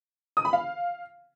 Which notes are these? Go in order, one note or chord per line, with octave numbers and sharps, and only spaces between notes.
D#6
B5
F5